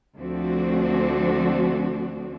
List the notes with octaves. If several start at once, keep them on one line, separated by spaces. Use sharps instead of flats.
D2 F3 A3 C4 D4 F#4